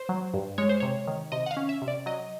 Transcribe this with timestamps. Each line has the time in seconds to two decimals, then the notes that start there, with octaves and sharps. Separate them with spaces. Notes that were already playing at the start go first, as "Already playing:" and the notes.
Already playing: C5
0.09 F#3
0.34 G2
0.58 G#3 C#5
0.69 C5
0.80 C3 C#5
1.07 D#3
1.32 C3 D#5
1.46 F#5
1.51 F5
1.57 C#4
1.69 E5
1.82 C3
1.88 D5
2.06 F#3 D#5